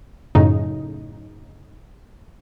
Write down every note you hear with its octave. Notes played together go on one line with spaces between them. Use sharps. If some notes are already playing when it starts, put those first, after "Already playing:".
F#2 A2 C#3 D#4